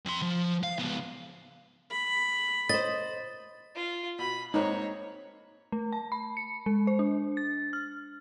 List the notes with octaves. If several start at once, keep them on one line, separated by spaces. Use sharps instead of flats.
F2 C6
F3
F5
C#2 B3
B5
C5 D#5 A6
F4
B2 B5
G#2 A#3 C4 D#4 C#5
A3
A5
B5
C#7
G#3
C5
D4
A6
F6